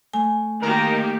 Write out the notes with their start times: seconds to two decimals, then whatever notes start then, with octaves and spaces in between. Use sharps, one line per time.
0.13 A3 G#5
0.62 D#3 A#3 G4 A#4